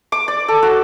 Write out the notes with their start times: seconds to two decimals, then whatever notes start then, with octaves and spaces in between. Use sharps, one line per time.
0.12 D6
0.28 D5
0.48 A4
0.63 F#4